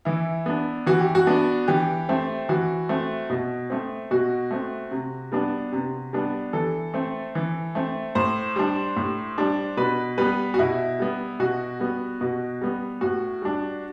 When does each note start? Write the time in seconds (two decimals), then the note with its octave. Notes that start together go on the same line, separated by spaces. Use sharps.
0.05 E3 E4
0.46 B3 D4
0.86 E3 F#4
1.00 G4
1.15 F#4
1.27 B3 D4
1.68 E3 G4
2.09 A3 C4
2.49 E3 F#4
2.89 A3 C4
3.30 B2
3.70 A3 C4
4.11 B2 F#4
4.51 A3 C4
4.91 C3
5.32 G3 B3 D4
5.72 C3
6.13 G3 B3 D4
6.53 E3 A4
6.94 A3 C4
7.35 E3
7.75 A3 C4
8.15 A2 C5
8.56 G3 D4
8.96 A2
9.38 G3 D4
9.77 B2 B4
10.18 G3 B3 B4
10.54 F#4
10.59 B2 E4
10.99 G3 B3
11.40 B2 F#4
11.80 G3 B3
12.21 B2
12.61 G3 B3
13.01 A2 F#4
13.42 G3 D4